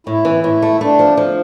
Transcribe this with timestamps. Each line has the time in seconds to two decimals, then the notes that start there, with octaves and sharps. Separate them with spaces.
0.07 A2 E4
0.25 E3
0.44 A2 E4
0.62 A3
0.80 A3 D4
0.99 F3
1.17 F3